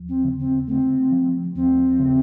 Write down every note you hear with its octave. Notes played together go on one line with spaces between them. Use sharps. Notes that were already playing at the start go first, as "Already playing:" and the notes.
Already playing: D#2 F3
C4
C#3
C4
A3 C4
F3
D#2 C4
C#3